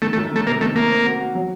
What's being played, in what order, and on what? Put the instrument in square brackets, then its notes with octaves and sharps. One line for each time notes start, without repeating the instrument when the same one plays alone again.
[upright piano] D#3 [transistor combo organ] A3
[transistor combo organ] A3
[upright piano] F#2
[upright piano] D#3 [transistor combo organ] A3
[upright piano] C3 [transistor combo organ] A#3
[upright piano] D#3 [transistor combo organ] A3
[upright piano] A3 [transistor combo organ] A#3
[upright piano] C4
F#4
F#4
F#3